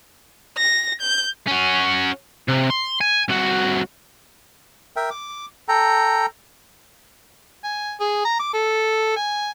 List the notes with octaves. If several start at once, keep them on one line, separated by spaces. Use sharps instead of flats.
A#6
G6
C#4 F#4
C3
C6
G#5
C2 F#4
A#4 E5 G5
D6
A4 G5 A#5
G#5
G#4
A#5
D6
A4
G#5